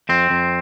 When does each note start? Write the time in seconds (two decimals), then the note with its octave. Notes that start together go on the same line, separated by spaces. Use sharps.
0.09 F2 C4
0.30 F2